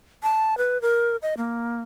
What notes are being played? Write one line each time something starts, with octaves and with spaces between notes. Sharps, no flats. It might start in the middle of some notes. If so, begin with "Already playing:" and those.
A5
B4
A#4
D#5
A#3